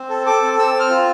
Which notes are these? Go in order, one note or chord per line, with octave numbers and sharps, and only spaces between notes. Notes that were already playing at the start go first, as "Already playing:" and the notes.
Already playing: C4
A4
A4 D6
C4
C4 E6
C4
F6
F4